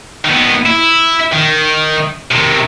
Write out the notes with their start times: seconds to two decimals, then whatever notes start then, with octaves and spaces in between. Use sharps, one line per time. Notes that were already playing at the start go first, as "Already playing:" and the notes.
0.25 D#3 B3
0.66 E4
1.33 D#3
2.31 C3 D#3